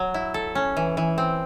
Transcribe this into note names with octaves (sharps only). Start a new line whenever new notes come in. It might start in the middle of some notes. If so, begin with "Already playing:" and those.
Already playing: F#3
E4
A4
C#4
E3
E3
C4